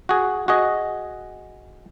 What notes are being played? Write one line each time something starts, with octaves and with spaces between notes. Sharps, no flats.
F#4 G#4
F#4 G#4 D#5